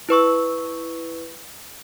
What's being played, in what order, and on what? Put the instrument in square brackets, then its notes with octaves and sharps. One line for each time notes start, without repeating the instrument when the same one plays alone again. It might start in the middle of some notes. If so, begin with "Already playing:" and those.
[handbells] E4 B4 C#6 E6